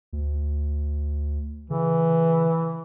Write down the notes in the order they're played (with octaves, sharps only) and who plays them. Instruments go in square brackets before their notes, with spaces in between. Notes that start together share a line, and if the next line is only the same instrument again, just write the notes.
[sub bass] D2
[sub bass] C#3 [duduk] E3